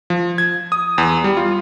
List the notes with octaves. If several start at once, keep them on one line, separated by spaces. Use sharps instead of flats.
F3
G#6
D#6
E2
G3
F4